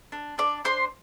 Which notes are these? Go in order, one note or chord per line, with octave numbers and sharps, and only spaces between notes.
D4
D4 D5 D6
D4 C5 C6